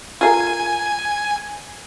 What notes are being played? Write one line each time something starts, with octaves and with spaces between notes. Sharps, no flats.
F4 G#4 A#4 G#5